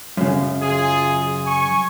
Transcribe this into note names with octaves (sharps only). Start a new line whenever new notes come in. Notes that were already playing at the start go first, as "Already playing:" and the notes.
F#2 C#3
F4 G#4
G#5 C#6